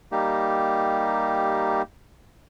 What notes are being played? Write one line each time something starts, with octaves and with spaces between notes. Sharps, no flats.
G3 A#3 D#4 G4